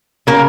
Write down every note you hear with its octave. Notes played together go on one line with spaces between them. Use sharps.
C#3 A#3 A#4